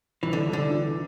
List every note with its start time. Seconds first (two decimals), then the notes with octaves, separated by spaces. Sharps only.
0.23 C2 E3
0.33 D3
0.47 C2
0.53 D3
0.71 E3